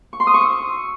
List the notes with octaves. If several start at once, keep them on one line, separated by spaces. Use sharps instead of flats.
C#6
C6
D#6
C#6
E6